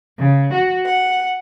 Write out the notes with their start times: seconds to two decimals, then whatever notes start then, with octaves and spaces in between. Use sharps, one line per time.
0.17 C#3
0.52 F#4
0.85 F#5